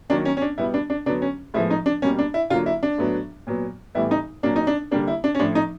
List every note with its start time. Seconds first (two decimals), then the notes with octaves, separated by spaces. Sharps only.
0.10 D#3 F#3 A#3 D4
0.25 C#4
0.37 C#4
0.42 D4
0.58 B2 G3 B3 E4
0.74 D4
0.90 D4
1.06 D3 F#3 B3 D4
1.22 C#4
1.54 A2 F3 G#3 B3 E4
1.71 D#4
1.86 D4
2.02 B2 G3 A#3 C#4
2.19 D4
2.34 E4
2.50 D3 F#3 A#3 F4
2.66 E4
2.83 D4
2.98 A2 F#3 B3
3.47 A#2 F#3 B3
3.95 A2 E3 G3 B3 E4
4.11 D#4
4.43 A#2 F#3 A#3 D4
4.56 D#4
4.67 D4
4.91 D3 G3 A#3 D4
5.07 E4
5.24 D4
5.35 C#4
5.39 A2 F3 A3 D4
5.55 D#4